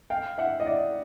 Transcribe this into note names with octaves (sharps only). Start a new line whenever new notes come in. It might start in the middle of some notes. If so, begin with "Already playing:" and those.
F5 G5
E5 F#5
D#5
D5 E5